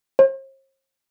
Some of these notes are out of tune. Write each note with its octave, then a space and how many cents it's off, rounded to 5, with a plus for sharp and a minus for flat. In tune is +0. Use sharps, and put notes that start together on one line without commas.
C5 +45